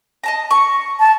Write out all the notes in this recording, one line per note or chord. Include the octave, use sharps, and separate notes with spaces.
D#5 A5 A#5
C#6
A5